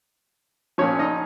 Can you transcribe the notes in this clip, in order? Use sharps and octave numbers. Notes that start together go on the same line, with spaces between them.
A#1 A#2 F3 C#4 C#5
D#4 D#5